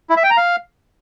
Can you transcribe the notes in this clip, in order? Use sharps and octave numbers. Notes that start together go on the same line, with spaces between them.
E4
E5
G5
A#5
F5